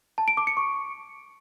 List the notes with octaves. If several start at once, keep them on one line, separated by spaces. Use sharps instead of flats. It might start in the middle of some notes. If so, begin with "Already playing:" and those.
A5
D7
D6
C#7
C#6